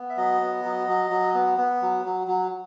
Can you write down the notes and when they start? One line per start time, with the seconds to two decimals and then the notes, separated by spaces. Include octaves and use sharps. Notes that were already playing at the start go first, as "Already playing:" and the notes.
Already playing: B3
0.10 E5
0.17 F#3 D#5
0.41 B3
0.64 F#3
0.88 F#3
1.10 F#3
1.34 B3
1.58 B3
1.82 F#3
2.05 F#3
2.27 F#3